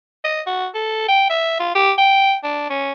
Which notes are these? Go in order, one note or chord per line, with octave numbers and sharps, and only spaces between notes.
D#5
F#4
A4
G5
E5
F4
G4
G5
D4
C#4